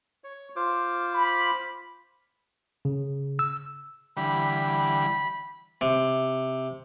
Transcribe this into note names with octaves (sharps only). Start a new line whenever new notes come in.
C#5
F4 C5 D6
B5
C#3
E6
D3 E3 G3 B5
C3